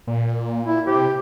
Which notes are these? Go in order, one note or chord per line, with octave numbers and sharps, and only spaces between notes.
A#2
E4
C3 G4